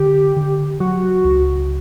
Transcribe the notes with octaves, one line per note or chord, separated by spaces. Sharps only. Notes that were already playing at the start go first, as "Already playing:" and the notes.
Already playing: D3 G4
D3
F#3 F#4
C#2